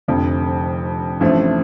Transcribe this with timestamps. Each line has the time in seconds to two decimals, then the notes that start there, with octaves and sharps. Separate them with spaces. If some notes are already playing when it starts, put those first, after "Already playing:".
0.08 F1 F2 D3
1.20 A1 G2 F3 A3 C4